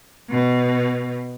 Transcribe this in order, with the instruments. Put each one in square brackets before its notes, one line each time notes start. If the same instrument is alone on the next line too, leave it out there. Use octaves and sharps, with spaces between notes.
[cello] B2